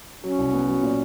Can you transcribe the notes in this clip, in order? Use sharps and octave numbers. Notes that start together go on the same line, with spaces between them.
F#3 C#4
C2
B3
F#3
A#2